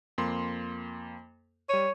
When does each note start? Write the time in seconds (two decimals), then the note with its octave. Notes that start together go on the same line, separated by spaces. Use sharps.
0.18 F2 A#3 C6
1.69 G3 C#5 D#7